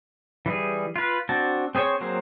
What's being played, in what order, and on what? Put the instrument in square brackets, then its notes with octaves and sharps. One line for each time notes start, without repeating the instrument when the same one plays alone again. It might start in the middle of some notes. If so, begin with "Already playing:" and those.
[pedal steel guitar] E3 G3 G#4
F4 B4
C4 D4 F#4 A5
C4 G#4 C5 C#5 C#6
F#3 A#3 C4 G#4 C5